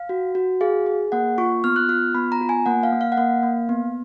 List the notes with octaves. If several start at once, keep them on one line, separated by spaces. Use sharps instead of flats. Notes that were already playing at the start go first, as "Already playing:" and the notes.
Already playing: F5
F#4
F#4
G#4 F5
G#4
A#3 F#5
F4 C#6
B3 F6
F#6
F4 F6
B3 B5
A#5
F4
G#5
A#3 F#5
F5
A#3
F5
F#5
A#3 F5
A#3
B3